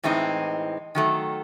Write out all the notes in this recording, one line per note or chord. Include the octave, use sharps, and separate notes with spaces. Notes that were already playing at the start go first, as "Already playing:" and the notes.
A2 E3 G#3 C4 D#4
D#3 F#3 A3